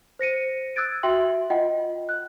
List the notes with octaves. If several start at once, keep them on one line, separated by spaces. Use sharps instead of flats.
C5 A#6 C#7 D#7
D#6 E6 F#6 G#6 A6 D7
F#4 E5 G5 C6 F#7
F4 D#5 F#5 G5
F#6